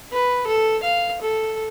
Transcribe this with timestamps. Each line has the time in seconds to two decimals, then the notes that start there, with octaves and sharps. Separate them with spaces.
0.12 B4
0.47 A4
0.83 F5
1.22 A4